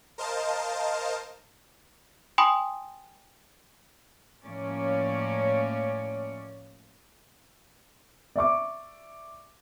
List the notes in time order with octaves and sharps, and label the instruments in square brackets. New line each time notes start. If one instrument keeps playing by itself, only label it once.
[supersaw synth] A#4 C5 D#5 F5 A5
[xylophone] G5 G#5 B5 C6 D#6
[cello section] A2 F3 A#3 C#4 C#5 D5
[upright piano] D5 E5 C#6 D6